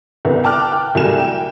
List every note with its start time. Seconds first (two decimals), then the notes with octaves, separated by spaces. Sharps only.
0.25 C2 B3
0.44 G5 A5 D6 F6 F#6
0.72 G5
0.95 C2 A2 F#3 G3 G#5 E7
1.20 G5